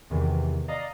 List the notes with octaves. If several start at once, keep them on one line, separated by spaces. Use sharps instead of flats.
E2 C3 D#3 E3
D5 D#5 F5 A#5 D#6